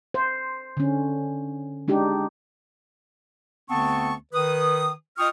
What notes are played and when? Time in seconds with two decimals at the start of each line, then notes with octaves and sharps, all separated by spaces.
0.14 C5
0.77 D3 C#4
1.88 G#3 D4 D#4 G4
3.69 D2 D3 B3 C4 A5 C#6
4.33 D#3 B4 D#6
5.18 F4 D#5 G5 C#6 D#6 F6